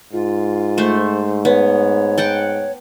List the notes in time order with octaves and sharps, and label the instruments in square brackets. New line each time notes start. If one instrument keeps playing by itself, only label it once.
[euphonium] G#2 [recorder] F4
[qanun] A3 C5
[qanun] B3 [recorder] C#5
[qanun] F#5 G5 A5